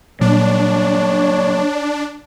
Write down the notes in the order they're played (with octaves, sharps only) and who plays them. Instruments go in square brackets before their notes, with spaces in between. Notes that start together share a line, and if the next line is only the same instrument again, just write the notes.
[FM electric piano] A#2 [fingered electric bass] F#3 G3 A#3 [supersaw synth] D4 [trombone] C#5